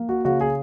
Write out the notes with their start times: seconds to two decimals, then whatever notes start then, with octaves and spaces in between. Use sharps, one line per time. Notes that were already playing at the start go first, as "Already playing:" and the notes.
Already playing: A#3
0.09 F#4
0.25 C#3 F#4
0.41 G#4